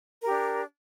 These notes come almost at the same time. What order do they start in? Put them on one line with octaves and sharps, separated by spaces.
A#4 G4 D4